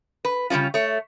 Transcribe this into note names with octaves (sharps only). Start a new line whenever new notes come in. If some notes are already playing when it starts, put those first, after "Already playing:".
B4
C#3 G3 G#3 C#4 F4
A3 C#5